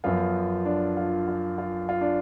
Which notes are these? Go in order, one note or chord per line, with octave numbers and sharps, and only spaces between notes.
F#2 F3 B3 F4
D4
F4
F4
F4
F4
D4